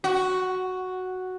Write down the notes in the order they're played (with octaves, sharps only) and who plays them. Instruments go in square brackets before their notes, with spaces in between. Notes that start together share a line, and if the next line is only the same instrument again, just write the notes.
[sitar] F#4